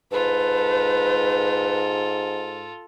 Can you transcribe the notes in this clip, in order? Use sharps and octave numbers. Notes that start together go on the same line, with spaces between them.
G#2 F4 A4 B4